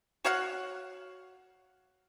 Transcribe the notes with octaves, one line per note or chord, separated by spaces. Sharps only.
F#4 C#5 F5 F#5